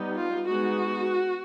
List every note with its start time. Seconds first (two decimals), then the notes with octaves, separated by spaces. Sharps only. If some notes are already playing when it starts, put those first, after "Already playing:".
Already playing: G3 B3 D#4
0.14 F4
0.48 G#3 B3 D#4 F#4